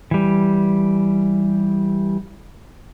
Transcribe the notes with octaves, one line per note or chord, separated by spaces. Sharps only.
E3 G3